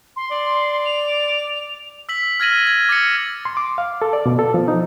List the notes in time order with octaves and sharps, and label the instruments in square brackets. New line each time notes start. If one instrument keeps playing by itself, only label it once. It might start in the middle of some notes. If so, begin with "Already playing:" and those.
[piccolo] C6
[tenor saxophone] D5
[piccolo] F7
[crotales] E6 B6 F#7
F6 G#6 A#6 D#7 F#7
G#6
D6 A6 A#6 C#7
[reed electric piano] C6
D6
F5
A4
D5
B2
A4
F3
D#4